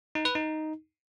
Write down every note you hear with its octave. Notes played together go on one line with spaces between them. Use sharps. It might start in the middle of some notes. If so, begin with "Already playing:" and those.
D#4
B4
D#4